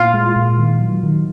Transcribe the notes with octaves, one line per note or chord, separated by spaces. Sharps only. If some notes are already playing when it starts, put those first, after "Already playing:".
Already playing: A#2 F4
G#3
A#2
D#3
F#3
D#3